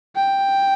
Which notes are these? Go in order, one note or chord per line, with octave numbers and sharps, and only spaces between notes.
G5